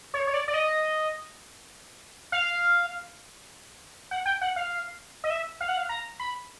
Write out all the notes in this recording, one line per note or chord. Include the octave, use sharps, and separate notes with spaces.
C#5
C#5
D5
D5
D#5
F5
F#5
G5
F#5
F5
D#5
E5
F5
F#5
F5
A#5
B5